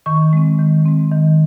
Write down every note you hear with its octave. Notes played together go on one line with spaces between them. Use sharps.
D#3 C#6
G#3 C4
D#3
G#3 C4
D#3